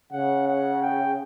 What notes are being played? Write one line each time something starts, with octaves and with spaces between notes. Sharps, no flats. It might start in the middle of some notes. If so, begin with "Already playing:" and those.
C#3 F#5
F#5
G5